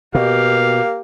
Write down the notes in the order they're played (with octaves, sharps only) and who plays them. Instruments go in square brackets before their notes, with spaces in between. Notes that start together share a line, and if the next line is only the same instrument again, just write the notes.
[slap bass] B2 [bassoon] A#3 [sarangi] G4 [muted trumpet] F5